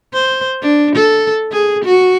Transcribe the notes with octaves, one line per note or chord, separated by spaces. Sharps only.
C5
D4
A4
G#4
F#4